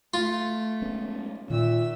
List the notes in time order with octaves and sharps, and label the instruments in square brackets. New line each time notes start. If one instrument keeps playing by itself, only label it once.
[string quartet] A3 [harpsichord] F4
[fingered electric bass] G#3 B3 C#4
[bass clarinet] A#2 [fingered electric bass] D#3 [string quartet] E5 E6